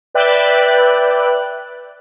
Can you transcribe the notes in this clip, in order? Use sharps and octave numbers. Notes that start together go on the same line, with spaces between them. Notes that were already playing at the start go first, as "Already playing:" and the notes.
B4 D5 E5 G5 F#6